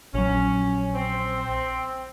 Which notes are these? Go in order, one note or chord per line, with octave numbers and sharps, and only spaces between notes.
A#1 F#3 C#4
C4